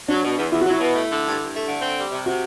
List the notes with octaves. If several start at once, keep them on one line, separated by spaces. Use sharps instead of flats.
F#3 D4
B2
E2
E2 E4
F#4
F#3 E4
B2
A3
D3
G2
G2
A3
D3
C4
G3
C3
C3 F#4